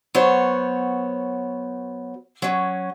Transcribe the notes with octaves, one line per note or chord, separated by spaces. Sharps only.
F#3 B3 C5 C#5
F#3 C#4